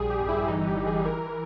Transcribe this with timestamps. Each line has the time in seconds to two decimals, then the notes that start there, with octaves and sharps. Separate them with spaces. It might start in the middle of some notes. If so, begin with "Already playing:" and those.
Already playing: A#1 G3 G#4
0.10 G4
0.20 G1
0.29 E4
0.47 E3 D#4
0.67 G4
0.76 G1
0.87 G#4
1.05 E3 A#4